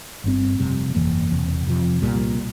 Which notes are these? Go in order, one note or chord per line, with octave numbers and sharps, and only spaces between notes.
G1 G2 G3 C4
F1 F2 C3 G3
G1 F2 E3 A#3
E1 E2 C3
F2 C3 F3
C2 A#2 G3